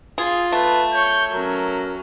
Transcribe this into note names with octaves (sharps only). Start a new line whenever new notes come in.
F4 G#4
A3 B4
C#5 C#6 G6
F#3 C#4 A#4